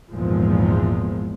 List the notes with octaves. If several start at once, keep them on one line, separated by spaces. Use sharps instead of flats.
G#1 E2 A#2 F3 G#3